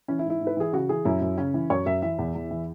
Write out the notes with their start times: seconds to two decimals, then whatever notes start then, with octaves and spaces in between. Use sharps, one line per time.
0.08 E3 C#4
0.19 E4
0.25 G#2
0.30 E4
0.41 G#2
0.47 B4
0.57 E3 G#4
0.73 C#3 F#4
0.89 E3 G#4
1.05 F#2 E4
1.22 F#2
1.38 C#3 C#4
1.54 E3
1.70 F#2 C#5
1.86 F#2 E5
2.02 E3 E5
2.19 E2
2.35 E2
2.51 E3